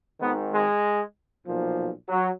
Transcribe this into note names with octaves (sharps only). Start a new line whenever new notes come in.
G#1 G#2 D#3 B3
G#3
B1 A#2 F3
F#3